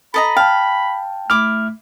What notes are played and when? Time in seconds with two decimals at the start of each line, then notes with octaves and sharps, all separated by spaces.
0.14 A4 D#5 A#5 B5
0.37 F5 G5 A5
1.30 A3 E4 D6 F6